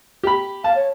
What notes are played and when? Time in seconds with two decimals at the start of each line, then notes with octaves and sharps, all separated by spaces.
0.23 G4 B5
0.64 F5 A5
0.76 C#5